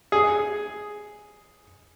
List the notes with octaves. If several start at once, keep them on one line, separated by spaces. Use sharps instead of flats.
G#4